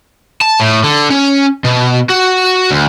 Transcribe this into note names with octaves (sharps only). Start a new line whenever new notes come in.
A5
A2
D3
C#4
B2
F#4
D2